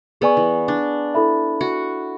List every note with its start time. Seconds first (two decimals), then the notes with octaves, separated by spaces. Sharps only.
0.21 B3 G#4 B4 D5 G#5 C#6
0.37 E3
0.68 D4
1.14 E4 A4 E5 B5
1.61 F#4